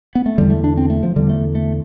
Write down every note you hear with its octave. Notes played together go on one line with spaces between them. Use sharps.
B3
A3
E2 D3 G3
A3
D4
C4
A3
F3
E2 D3 G3
A3
A3